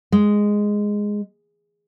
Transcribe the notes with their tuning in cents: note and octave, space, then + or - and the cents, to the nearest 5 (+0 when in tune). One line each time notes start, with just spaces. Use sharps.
G#3 -5